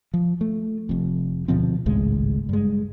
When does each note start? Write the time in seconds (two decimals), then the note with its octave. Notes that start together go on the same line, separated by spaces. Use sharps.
0.14 F3
0.41 A3
0.89 F1 F2
1.48 D2 B2 F3 C4
1.86 G#1 C#2 A2 G#3
2.49 G2 G#3